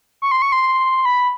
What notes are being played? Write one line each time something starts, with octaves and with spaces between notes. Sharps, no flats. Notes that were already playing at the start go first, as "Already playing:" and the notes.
C#6
C6
C#6
C6
B5